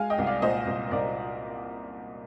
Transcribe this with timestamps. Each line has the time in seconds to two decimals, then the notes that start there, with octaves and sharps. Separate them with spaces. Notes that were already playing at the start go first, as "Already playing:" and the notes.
Already playing: G#3 F5 G#5
0.10 D#5 G5
0.18 C2
0.26 D5 F5
0.42 A#2 C5 D#5
0.66 C2
0.91 C2 A#4 D5